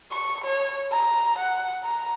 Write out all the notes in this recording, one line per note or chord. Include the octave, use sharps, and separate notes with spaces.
C#6
C#5
A#5
F#5
A#5